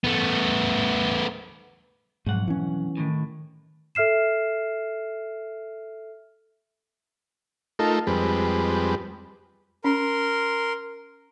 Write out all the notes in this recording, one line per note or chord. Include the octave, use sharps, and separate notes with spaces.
A3 B3
B1 F2 G#2 F#5
E3 C#4
A2 D#3
A4 E5 F6 C7 E7
A3 D#4 F4 A4 A#4
F2 G3 G#3 C4 B4
C#4 A#4 C6